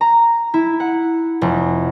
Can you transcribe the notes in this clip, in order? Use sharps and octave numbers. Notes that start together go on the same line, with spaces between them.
A#5
E4
F#5
F1